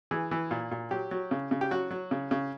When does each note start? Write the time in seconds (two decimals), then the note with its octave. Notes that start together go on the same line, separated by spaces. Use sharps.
0.11 E3 G#4
0.31 E3
0.51 A#2
0.71 A#2
0.91 F#3 G4
1.11 F#3
1.31 C#3
1.51 C#3
1.61 G4
1.71 F#3 F#4
1.91 F#3
2.11 C#3
2.31 C#3